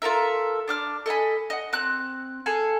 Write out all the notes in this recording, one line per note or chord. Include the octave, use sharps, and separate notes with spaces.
F4 A4 A#4 E5
D4 D6 F6
A4 D#5 G#5 B5
D#5 F#5
C4 F#6
G#4 A4 F5 G#5